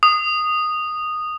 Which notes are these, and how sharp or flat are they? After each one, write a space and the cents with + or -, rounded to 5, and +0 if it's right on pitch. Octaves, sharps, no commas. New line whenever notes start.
D#6 -10